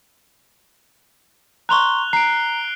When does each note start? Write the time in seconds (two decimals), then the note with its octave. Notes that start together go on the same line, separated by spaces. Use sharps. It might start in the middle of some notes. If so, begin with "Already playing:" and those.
1.69 A#5 C6 C#6 F#6 F7 G7
2.13 A#5 C7 D7